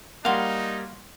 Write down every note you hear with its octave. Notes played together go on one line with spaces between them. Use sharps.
G3 A#3 D#4 F#4 F5 C6